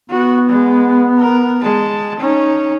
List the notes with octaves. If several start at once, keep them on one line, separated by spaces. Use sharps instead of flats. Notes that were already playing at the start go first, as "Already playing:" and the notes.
B3 F#4
G#3
A#4
G#3 A5
C#4 D#4